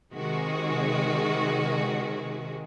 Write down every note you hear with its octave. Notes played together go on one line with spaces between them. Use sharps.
C3 D#3 G#3 F#4 G#4